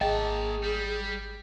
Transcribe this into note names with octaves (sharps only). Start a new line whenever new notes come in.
G#1 A#3 G#4 D#5 G5 A5
G3